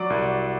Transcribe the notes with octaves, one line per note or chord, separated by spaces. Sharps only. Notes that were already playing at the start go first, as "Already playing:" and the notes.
Already playing: F#3 D5 D6
C2